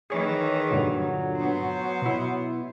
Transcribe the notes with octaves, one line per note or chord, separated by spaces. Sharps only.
D#3 E3 G#4 C#5
G2 A#2 D3 F#3
B3 C5
B2 E4